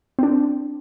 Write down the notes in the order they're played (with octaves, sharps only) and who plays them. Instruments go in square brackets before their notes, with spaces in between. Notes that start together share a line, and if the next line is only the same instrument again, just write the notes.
[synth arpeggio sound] C4 D4